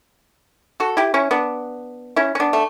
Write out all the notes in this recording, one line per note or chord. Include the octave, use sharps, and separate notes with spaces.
F#4 A4
E4 G4
C#4 E4
B3 D4
C#4 E4
C#4
B3 D4
A3